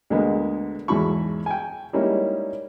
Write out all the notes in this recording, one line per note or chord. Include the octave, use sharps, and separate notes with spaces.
D2 D3 G#3 A#3 B3
E2 G#2 F#3 E4 B5 C#6
G5 G#5
G3 G#3 A#3 C#4 D#4 E4